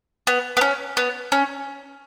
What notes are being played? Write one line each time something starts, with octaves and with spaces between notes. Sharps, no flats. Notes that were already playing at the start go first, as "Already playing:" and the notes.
B3
B3
C#4
B3
C#4